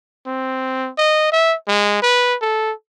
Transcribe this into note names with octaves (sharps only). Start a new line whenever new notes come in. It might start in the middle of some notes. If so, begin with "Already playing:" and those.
C4
D#5
E5
G#3
B4
A4